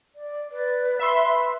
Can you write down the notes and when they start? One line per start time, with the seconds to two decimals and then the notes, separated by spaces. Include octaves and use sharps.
0.15 D5
0.52 B4 D5
0.99 E5 B5 C6